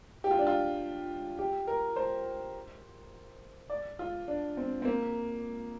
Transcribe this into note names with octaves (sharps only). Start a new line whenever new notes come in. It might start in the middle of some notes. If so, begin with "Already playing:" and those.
G4
F4
D4
F4
G4
A#4
C5
D5
F4
D4
C4
C4
A#3